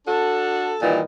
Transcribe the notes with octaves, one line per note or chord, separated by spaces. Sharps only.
D4 F#4 A4
G2 A#2 D#3 E3